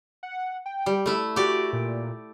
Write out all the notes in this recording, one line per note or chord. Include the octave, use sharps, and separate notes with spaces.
F#5
G5
G3
A3 E4
F#4 G4 D5
A#2